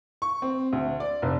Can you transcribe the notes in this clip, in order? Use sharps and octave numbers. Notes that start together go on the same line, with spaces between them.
C#6
C4
D2
D5
F1